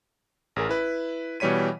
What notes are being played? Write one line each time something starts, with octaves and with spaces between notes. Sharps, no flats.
A1 G#4 A#4
E4 B4
B2 E3 G3 C#5 B6 D#7